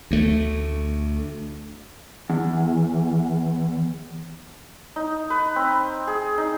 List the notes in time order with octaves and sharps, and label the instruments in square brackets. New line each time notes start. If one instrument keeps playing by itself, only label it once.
[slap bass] D2 A3
[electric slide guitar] E2
[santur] D#4
B4
C4
G#4
D#4